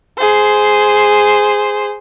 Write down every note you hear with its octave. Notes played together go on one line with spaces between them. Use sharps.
G#4 C5